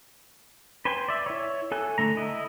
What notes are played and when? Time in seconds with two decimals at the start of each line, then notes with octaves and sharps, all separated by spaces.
0.85 B4 C5 G5 G#5
1.08 D5 E5
1.26 E4 C#5
1.72 A4 G#5 F#6
1.98 D3 A3 A#5
2.17 E4 D#5